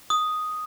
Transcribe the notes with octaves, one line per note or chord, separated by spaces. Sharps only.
D#6